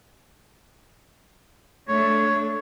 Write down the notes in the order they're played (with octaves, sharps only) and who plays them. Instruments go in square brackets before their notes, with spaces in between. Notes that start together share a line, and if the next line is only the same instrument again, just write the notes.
[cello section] A3 D4 [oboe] C#5